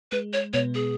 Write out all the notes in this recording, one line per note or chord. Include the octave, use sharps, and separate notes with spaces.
G#3 B4
C#5
B2 B3 C#5
G#4